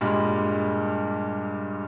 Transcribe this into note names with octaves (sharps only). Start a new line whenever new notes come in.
G2 A#2 G3 G#3